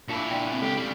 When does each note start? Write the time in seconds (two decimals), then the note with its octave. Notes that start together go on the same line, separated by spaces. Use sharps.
0.08 A#2 D4 E4 F4 A5
0.30 D4 D5 G5
0.47 A#3 C4
0.62 C#2 G#3 D4 G4 A4
0.77 C#3 G3